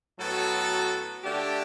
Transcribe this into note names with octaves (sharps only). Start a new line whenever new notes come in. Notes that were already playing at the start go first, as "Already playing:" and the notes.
A2 F#3 B3 F#4 A4
D3 A3 D4 G4